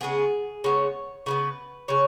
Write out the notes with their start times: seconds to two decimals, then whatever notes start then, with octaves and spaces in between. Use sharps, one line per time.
0.01 C#3 G#3 B3 G#4
0.64 C#3 G#3 B3 C#5
1.26 C#3 G#3 B3 B4
1.88 C#3 G#3 C#5